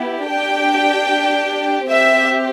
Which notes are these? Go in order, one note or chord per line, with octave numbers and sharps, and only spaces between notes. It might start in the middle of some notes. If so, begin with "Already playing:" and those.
Already playing: B3 E4 G4
D4 G4 G5
C4 G4 E5